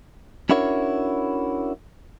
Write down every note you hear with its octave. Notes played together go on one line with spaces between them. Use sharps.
C#4 D4 E4 F#4 A#4 C#5